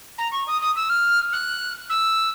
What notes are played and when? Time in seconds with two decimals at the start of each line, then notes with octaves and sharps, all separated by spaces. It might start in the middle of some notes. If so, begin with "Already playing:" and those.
0.18 A#5
0.32 C#6
0.47 D#6
0.61 D#6
0.76 E6
0.89 F6
1.32 F#6
1.89 E6